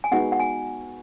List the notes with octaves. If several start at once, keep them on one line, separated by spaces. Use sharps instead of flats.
G#5
G#3 B3 D#4 F#4 B4 F#5
F#5
G#5